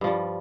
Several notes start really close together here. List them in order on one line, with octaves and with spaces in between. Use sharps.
G2 F3 G3